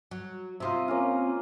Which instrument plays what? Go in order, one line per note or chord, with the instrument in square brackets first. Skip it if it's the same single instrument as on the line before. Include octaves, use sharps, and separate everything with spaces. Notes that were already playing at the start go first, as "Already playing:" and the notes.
[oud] F#3
[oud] C3 C4 [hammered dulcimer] F4 D#5 E5
[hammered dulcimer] A#3 C#4 F4